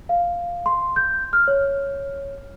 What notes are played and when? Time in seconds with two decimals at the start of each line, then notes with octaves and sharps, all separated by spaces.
0.09 F5
0.66 C6
0.96 G6
1.33 F6
1.48 C#5